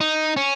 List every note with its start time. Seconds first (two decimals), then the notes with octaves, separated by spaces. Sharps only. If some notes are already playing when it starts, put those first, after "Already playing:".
0.01 D#4
0.37 C#4